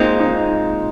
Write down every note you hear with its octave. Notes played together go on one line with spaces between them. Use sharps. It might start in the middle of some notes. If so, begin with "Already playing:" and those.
Already playing: A#2 G#3 C4 D#4 F4
D#4